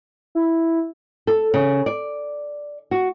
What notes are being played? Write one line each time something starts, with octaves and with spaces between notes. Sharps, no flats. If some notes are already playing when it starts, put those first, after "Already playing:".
E4
A4
C#3
D5
F#4